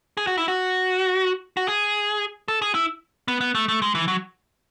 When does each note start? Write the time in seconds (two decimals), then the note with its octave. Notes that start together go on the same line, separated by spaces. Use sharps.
0.17 G#4
0.27 F#4
0.37 E4
0.48 F#4
1.57 F#4
1.68 G#4
2.48 A4
2.62 G#4
2.75 E4
3.28 B3
3.41 B3
3.55 A3
3.69 A3
3.82 G#3
3.95 E3
4.08 F#3